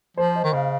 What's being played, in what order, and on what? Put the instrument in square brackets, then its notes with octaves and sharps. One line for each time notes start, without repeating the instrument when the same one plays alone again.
[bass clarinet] F3 [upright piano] C5
[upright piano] D#5
[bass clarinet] D#3
[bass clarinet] C#3 [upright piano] F5